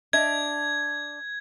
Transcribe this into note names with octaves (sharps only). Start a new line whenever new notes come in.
D4 D#5 E5 G#6